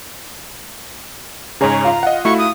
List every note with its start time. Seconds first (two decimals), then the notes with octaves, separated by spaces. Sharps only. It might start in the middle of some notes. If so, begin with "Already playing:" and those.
1.61 G#2 C#3 G#4 C#5 A#5
1.84 F4 F5
2.03 D#5 F#5
2.25 A3 E4 F#4 C#6
2.39 D#6